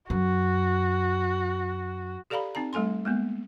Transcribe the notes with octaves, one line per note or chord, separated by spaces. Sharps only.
F#2 F#4
G4 A4 D5 F5 A#5 B5
C4 D#4 A5 A#5
G3 A3 A4 G#5 C6
G#3 A#3 B3